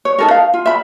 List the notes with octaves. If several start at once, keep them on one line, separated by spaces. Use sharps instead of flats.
C#5
D#4 A4 A#4
F5
F4
E5 B5